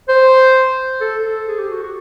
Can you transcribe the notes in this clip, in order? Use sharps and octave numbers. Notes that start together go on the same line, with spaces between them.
C5
A4
A4
G#4
G4
F#4
F#4